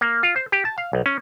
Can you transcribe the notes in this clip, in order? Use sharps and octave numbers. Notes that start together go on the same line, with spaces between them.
A#3
F4
C5
G4
A5
F5
B1
C#4